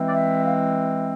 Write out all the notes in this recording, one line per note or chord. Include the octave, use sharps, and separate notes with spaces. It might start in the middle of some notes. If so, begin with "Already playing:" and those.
Already playing: E3 G#3 C4 E4
D5
E5
F5